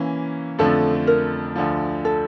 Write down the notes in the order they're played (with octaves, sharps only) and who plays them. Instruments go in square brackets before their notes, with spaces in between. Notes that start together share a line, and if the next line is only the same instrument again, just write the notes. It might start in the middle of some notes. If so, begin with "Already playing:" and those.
Already playing: [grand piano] E3 A#3 C#4
[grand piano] F2 D3 F3 A3 [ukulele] A4
[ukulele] A#4
[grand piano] D2 D3 F3
[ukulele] A4